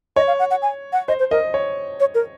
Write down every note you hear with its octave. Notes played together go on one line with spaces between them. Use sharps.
C#5 D#5
F5
F#5
F#5
G#5
F#5
C5 D#5
C5
A#4 D#5
C#5
C#5
A#4